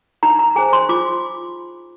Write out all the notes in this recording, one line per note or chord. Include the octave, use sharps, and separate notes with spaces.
D#4 A#5
A#5
G#4 C5 G#5
C6
F4 D6